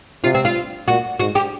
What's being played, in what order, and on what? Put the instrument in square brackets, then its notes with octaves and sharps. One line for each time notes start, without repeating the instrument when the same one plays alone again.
[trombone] C3 [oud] F4
[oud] C4
F4
[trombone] A#2 [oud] F#4
[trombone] G#2 [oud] F#4
[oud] G4